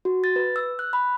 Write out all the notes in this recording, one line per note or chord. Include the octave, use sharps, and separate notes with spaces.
F#4
A6
B4
E6
F#6
B5